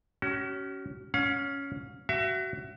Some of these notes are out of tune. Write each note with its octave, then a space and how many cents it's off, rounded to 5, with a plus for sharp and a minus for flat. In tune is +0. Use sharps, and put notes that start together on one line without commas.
C#4 +10 F#4 +40
C#4 +10 F5 +45
F#4 +25 E5 +35